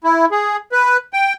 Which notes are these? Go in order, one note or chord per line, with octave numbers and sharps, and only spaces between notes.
E4
G#4
B4
G5